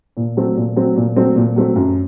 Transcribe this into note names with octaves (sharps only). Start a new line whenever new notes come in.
A#2
F#3 A3 C4
A#2
F#3 A3 C4
A#2
F#3 A3 C4
A#2
F#3 A3 C4
F#2